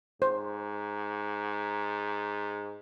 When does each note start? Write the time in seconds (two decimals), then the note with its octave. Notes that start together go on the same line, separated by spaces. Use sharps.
0.22 G#2 C5